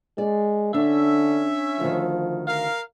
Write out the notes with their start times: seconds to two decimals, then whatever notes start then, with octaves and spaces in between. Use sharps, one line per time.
0.18 G#3 D5
0.74 D3 C#4 D4 E5
1.80 D2 D#3 F3
2.47 A#4 F5